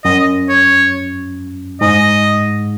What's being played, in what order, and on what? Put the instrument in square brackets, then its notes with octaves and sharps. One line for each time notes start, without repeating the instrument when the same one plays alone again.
[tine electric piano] F#2 [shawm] D#5
[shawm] C#5
[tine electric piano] G#2 [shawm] D#5